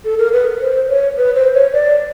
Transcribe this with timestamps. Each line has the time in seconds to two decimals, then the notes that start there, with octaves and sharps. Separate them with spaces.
0.05 A4
0.18 A#4
0.33 B4
0.61 C5
0.89 C#5
1.17 B4
1.35 C5
1.54 C#5
1.73 D5